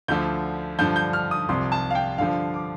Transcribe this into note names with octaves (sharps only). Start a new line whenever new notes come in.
D2 D3 F3 G6
G2 D3 F3 G6
G6
F6
D#6
C2 C3 F3 C6
A5
F5
G5
G2 D3 F3 F5
D6